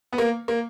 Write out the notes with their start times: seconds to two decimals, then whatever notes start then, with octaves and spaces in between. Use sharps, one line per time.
0.13 B3
0.18 A#3
0.48 A#3